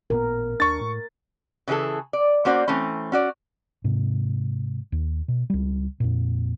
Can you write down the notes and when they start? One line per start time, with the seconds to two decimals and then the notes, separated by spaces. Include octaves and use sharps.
0.10 A1 A#2 B3 A#4
0.60 D#2 D4 C#6 A6
0.81 A2
1.68 C#3 E3 D4 G#4 A4
2.13 D5
2.45 A#3 C#4 F#4 C5 D5
2.68 E3 A3 C4 C#4
3.12 C#4 F#4 D5
3.84 G#2 C3
4.92 D#2
5.28 B2
5.50 C#2 G3
6.00 F2 A#2